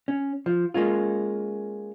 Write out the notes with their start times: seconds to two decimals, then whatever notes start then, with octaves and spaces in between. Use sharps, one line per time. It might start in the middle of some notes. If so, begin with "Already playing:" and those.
0.08 C#4
0.46 F3
0.74 G#3 A#3 C#4 F4